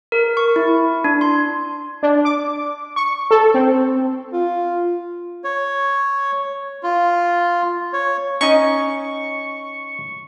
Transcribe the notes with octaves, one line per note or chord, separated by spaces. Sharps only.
A#4
C#6
E4
D4
C6
D4
D6
C#6
A4
C4
F4
C#5
F4
C#5
C#4 D#4 D#5 C#6